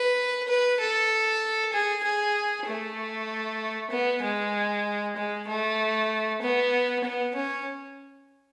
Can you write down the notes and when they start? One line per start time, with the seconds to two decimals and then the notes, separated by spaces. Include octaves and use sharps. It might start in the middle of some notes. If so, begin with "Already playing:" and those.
Already playing: B4
0.48 B4
0.80 A4
1.73 G#4
2.04 G#4
2.66 A3
3.91 B3
4.23 G#3
5.16 G#3
5.48 A3
6.41 B3
7.04 B3
7.35 C#4